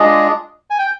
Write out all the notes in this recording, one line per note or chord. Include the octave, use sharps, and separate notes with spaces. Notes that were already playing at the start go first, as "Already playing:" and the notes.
Already playing: G#3 D4 F4 G#4 D#5
G#5
G5